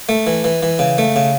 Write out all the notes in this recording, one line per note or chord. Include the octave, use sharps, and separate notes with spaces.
A3
E3
E3
E3
C#3
A3
C#3